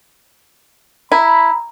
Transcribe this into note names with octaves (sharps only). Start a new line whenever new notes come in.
E4 A#5 B5